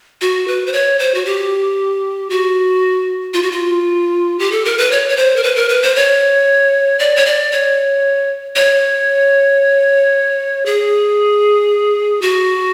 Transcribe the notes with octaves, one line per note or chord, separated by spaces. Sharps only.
F#4
B4
C5
C#5
C5
F#4
G4
F#4
F4
F#4
F4
G4
A4
A#4
B4
C#5
C#5
C5
A#4
B4
A#4
B4
C5
C#5
D5
C#5
D5
C#5
C#5
G#4
F#4